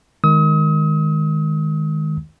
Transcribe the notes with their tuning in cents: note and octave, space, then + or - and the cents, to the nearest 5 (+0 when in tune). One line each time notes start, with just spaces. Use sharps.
D#3 +0 G#3 +10 D#6 +40